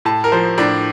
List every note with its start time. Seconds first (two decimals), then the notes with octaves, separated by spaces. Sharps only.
0.05 A2 A5
0.24 A#4
0.32 F3 C5
0.58 A2 D4